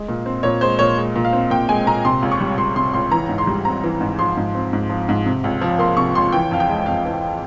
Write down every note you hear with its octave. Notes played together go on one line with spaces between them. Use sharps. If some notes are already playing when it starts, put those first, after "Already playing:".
Already playing: G#3
A#2
C4
A#2 C#5
G#3 C5
A#2 C#5
G#3
A#2
F5
C4
A#2 G5
G#3 G#5
A#2 A#5
C3 C6
C#2
C#6
G3
C#2 C6
C3 C6
C#2 C6
E3 A#5
G#2
C6
G3
C4 A#5
E3
G#2
F3 C6
G#2
C4
G#2
F3
G#2
C3
C#2
F3
A#3 C6
C3 C#6
C#2 C6
E3 G5
F2 F5
G5
G#3
F2 F5
E3